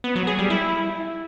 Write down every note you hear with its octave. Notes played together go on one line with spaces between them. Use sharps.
B3
F#3
G#4
G3
E4